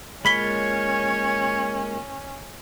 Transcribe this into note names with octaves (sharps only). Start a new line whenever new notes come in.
G#3 A#3 C#4 F4 C#5 B5 B6 G7